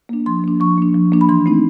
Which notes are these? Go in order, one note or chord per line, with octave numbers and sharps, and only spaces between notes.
A#3 D4
F3 C6
A#3 D4
F3 C#6
A#3 D4
F3
A#3 D4
B5
E3 C6
A3 C4 D#4